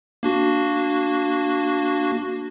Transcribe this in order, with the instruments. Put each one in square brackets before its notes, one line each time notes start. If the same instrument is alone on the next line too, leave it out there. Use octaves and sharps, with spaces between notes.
[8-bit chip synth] A#3 D4 F#4